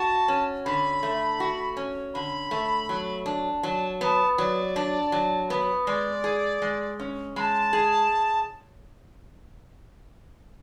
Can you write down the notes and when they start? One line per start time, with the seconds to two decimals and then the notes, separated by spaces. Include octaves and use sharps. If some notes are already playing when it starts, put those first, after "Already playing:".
Already playing: F#4 A5
0.28 C#4
0.65 D3 B5
1.03 A3
1.40 F#4
1.77 C#4
2.14 D3 B5
2.51 A3
2.89 F#3
3.26 D4
3.63 F#3 A5
4.01 B3 B5
4.05 A5
4.38 F#3 D5
4.76 D4
5.12 F#3
5.50 B3
5.87 G#3 D5
6.24 G#4
6.62 G#3
7.00 C#4
7.36 G#3 A5 B5
7.73 G#4